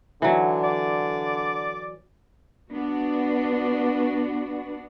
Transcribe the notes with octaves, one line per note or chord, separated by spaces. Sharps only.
D3 E3 F#3
D5
B3 D4 F#4